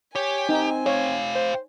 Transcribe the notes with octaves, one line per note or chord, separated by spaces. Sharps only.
G4 C#5 G#5
C4 D#4
G4 C#5 F5
C5